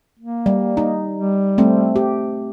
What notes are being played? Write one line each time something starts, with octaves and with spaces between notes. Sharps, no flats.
A#3
G3
D#4
G3
A3 C4
G4